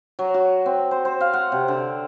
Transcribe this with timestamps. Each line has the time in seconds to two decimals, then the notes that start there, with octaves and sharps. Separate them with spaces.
0.19 F#3
0.34 F#4
0.66 C4
0.91 C5
1.05 C5
1.21 F5
1.33 F#5
1.52 C3
1.68 D3